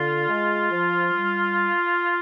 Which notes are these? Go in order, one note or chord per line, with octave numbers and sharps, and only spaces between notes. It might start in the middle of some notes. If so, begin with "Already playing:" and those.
Already playing: D3 F4
G#3
F3
G3